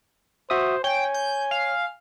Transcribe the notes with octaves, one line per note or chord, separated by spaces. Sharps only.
F#4 C5 E5 D#6
C#5 G5 G#5
G6
F5